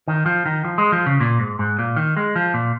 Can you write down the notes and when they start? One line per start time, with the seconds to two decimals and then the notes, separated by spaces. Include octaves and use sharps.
0.08 D#3
0.26 F3
0.46 D#3
0.65 F3
0.78 G#3
0.92 F3
1.06 C#3
1.20 A#2
1.40 G#2
1.59 G#2
1.79 A#2
1.96 D#3
2.17 G#3
2.36 F3
2.54 A#2